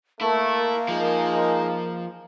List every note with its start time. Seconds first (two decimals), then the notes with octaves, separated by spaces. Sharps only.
0.21 A3 A#3 E4 A#4
0.88 F3 G#3 D#4